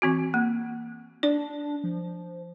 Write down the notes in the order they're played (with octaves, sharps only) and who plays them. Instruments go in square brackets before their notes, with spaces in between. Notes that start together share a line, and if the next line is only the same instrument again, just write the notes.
[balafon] E3 C4 F#4
A#3
[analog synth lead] D4 [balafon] D5
[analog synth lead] F3